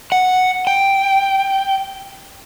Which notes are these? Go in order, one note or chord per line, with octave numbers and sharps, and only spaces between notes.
F#5
G5